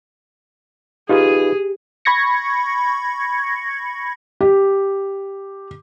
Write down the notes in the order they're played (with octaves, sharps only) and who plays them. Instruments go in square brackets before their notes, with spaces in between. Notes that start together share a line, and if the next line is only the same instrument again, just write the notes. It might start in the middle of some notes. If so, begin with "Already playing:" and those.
[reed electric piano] D#4 F4 B4 [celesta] G4 [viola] G#4
[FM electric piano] B5 C#6 G#6 A#6 C#7
[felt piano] G4